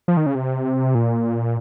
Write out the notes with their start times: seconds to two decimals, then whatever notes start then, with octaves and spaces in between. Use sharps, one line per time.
0.08 F3
0.17 D#3
0.26 C#3
0.35 C3
0.95 A#2